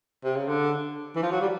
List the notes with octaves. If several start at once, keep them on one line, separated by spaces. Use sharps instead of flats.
C3
C#3
D3
E3
F3
F#3
G3